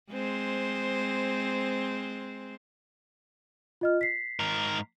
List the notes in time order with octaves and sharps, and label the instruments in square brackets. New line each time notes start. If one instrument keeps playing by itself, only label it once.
[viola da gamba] G#3 C4 C5
[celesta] F4 D#5 F6
B6 C7
[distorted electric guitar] G#2 A#4